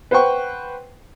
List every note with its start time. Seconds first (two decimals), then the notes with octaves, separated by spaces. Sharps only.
0.11 B4 C5 F#5 G5 C#6